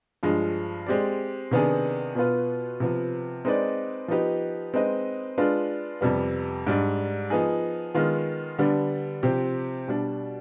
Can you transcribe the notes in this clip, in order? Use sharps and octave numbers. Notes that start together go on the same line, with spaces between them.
G2 F3 G#3
G#3 C4 G4 D5
C3 D#3 B3 D4 G#4
B2 B3 F4 B4
C3 F3 B3
G#3 C4 D#4 B4 D5
F3 B3 D#4 G4 B4
G#3 C4 D#4 B4 D#5
G#3 D4 F4 B4
F2 C3 G3 B3
G#2 G3 D4
F3 B3 D#4 G#4
D#3 G#3 B3 F4
D3 G3 B3 D4
C3 F3 C4 G4
B2 G3 D4